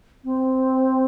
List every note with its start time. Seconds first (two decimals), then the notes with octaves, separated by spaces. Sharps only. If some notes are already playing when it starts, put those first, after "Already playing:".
0.24 C4